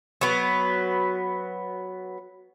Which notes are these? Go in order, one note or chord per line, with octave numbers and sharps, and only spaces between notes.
F#3 B3